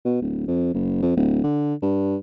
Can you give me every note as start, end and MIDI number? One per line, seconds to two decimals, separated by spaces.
0.05 0.20 47
0.22 0.46 26
0.48 0.73 41
0.74 0.98 30
1.03 1.14 41
1.17 1.43 26
1.44 1.74 50
1.82 2.16 43